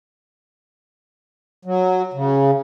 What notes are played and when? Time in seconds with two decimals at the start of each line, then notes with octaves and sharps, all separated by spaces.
1.65 F#3
2.14 C#3